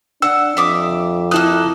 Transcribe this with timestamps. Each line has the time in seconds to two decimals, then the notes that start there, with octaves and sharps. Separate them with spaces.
0.22 D4 F#5 E6
0.57 F2 E5 D6 D#6
1.31 A#3 E4 A4 D#6 F#6